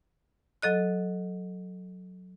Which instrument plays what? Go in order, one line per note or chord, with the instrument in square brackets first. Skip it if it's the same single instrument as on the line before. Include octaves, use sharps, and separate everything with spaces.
[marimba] F#3 A4 D#5 F#6